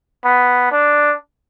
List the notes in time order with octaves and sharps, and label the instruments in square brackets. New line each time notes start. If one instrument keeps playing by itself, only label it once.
[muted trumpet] B3
D4